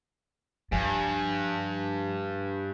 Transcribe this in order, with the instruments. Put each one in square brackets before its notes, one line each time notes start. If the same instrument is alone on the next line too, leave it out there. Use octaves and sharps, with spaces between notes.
[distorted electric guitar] G2 [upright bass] F3 [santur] G#5